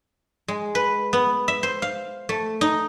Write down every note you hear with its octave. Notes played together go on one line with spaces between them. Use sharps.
G#3
B4
B3
E5
C5
F5
A3
D#4